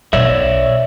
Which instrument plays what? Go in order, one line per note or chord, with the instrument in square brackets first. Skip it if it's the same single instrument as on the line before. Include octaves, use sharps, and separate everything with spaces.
[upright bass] B1 [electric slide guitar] C#5 D5 E5